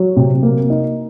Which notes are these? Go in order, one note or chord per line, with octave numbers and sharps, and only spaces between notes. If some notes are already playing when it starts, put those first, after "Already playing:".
Already playing: F#3
C3
A#3
D#4